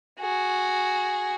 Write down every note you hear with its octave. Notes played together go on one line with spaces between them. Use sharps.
F#4 G#4